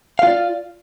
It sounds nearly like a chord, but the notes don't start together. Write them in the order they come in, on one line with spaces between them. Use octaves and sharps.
F5 F4 D5